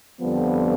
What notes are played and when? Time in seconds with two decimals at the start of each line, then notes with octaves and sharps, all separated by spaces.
0.21 F2 D3 F3 G3 B3